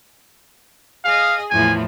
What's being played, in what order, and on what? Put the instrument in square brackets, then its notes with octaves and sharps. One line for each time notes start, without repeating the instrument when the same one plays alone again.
[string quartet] G#4 D#5 [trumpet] F5
[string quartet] E2 A2 F3 [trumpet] G#5